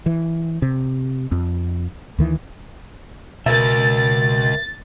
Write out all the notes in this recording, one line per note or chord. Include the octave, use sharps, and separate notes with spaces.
E3
C3
F2
D2 D#3 E3
C#2 B2 A#4 B4 E5 A6